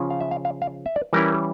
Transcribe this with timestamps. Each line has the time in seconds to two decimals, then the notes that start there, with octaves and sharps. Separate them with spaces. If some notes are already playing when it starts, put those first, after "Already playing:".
Already playing: C#3 F3 C#4 F4
0.10 F5
0.21 E5
0.31 F5
0.45 F5
0.62 F5
0.86 E5
0.96 D5
1.13 E3 G3 C#4 E4 A#4